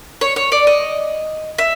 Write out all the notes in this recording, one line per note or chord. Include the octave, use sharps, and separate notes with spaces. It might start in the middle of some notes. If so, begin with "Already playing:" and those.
C#5
C#5
D5
D#5
E5